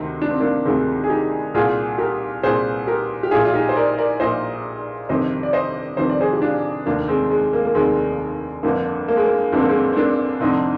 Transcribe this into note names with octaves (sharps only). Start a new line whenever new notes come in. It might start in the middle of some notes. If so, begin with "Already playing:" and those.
Already playing: D2 C3 D#3 C4 D#4
D4
C4
A#3 D4
D2 C3 D#3 G#3 C4
G#4
D#4 G4
C2 A#2 F4 G#4
G4 A#4
C2 A#2 G#4 C5
G4 A#4
G4
A#1 A#2 F4 G#4
F4
D#4 G4
C5
A#4 D5
A#4 D5
A#1 A#2 C5 D#5
G1 F2 C3 D#3 C5 D#5
D5
C5 D#5
G1 F2 C3 D#3 C5
D5
G#4 C5
G4
D4 F4
F1 D#2 D#3 A#3 D4
G#3 C4
G#3
A#3
A#3
F1 D#2 D#3 G#3 C4
G1 F2 D3 A#3
A#3
G#3
A#3
G1 F2 D3 C4
A#3
G#3 C4
C4
A#3 D4
F1 F2 D3 C4 D#4